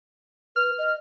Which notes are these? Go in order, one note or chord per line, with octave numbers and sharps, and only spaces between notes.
B4 F6
D#5